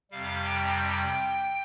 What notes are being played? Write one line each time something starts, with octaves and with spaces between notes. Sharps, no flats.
F2 C3 G3 F5
G5
G5